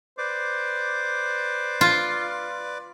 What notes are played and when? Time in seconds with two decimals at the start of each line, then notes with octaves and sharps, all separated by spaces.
0.18 B4 C5 D5 D6
1.81 F4